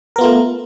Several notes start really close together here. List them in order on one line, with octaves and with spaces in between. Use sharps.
A#4 B3 F4 A3